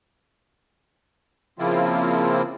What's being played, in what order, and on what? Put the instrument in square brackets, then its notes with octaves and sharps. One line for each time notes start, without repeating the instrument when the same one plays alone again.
[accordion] C#3 F3 A#3 C4 E4 F4